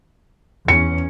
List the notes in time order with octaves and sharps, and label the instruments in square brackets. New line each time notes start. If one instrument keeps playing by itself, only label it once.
[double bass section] E2 C#4 [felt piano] C#7